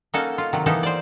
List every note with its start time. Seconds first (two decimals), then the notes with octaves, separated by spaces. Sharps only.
0.14 A#3 C#4 D#4 F#4 A4
0.38 F4
0.53 C3 D#3 F#3
0.66 E3 A#3 B3 D#4 A4
0.83 C5 D5